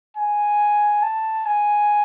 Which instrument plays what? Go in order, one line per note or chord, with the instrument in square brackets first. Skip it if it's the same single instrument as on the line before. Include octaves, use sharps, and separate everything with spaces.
[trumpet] G#5
A5
G#5